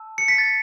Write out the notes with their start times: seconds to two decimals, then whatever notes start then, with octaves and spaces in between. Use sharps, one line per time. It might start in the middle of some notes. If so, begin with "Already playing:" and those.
Already playing: A5 E6
0.18 C#7
0.28 B6
0.38 A6